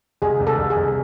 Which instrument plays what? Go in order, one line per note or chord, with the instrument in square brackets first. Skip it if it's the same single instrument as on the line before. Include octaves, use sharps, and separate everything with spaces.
[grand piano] C2 [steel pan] G#4
[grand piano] C2
[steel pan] A4
[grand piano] C2
[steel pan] G#4
[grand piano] C2